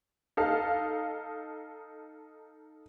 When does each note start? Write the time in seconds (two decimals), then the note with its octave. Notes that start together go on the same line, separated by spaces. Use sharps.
0.37 D#4 A4 F5